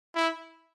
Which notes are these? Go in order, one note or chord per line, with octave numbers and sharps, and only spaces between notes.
E4